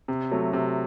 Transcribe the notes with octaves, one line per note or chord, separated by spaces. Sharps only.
C3
F#3 A3
C3